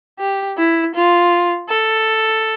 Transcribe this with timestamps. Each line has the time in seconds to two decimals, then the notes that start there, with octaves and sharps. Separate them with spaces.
0.19 G4
0.58 E4
0.95 F4
1.69 A4